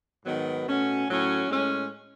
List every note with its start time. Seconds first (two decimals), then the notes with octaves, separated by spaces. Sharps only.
0.25 G#2 D#3 F#3 B3
0.66 B2 A3 C#4 F#4
1.07 A2 F#3 C#4
1.48 A2 G#3 C#4